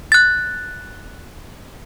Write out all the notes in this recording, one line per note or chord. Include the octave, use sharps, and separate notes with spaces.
F#6 A6